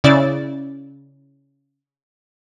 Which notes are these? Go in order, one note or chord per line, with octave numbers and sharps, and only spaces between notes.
C#3 E4 D5 A6